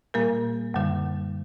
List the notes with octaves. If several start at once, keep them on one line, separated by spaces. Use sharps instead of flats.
A#2 G3 A#3 A#4
F#2 D3 G3